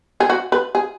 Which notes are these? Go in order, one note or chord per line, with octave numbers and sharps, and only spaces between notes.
G#4
F#4
B4
G#4